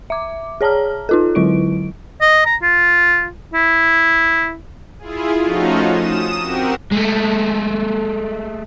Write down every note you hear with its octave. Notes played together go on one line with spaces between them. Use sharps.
E5 D6
G#4 C#5 A5 A#5 F6
D#4 F4 A4
D3 F#3 E4 D7
D#5
A#5
F4
E4
E4 F4 G#4
F3 A3 C#4 D#4 F4 F#4
D#6 E7
C4 F#4 G4 A#4
G#3 A3